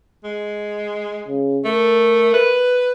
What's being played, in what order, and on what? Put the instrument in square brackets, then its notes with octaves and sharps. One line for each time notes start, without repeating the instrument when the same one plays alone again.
[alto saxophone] G#3
[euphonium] C#3
[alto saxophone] A3 [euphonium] A#4
[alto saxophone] B4